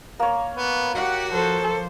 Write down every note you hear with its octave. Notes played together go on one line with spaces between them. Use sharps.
A#3 C#5
B3
F#4 G4 F#5
F3 A4 C5